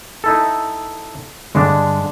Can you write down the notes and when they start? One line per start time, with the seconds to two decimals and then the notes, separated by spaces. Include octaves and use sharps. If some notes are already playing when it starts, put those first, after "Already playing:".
0.24 D#4 E4 A4
1.55 G2 D3 G#3 D4